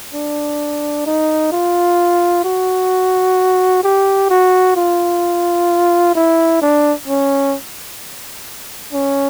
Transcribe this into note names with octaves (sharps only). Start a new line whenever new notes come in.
D4
D#4
F4
F#4
G4
F#4
F4
E4
D4
C#4
C#4